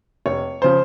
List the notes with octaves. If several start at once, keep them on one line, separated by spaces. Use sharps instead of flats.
F1 C#5
C#3 F3 C5